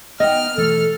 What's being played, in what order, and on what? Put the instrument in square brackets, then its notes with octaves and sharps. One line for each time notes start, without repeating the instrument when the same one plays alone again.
[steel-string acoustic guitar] B3 D#4 G5 [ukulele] D#5 [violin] F6
[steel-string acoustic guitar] B2 E3 A3 [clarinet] A4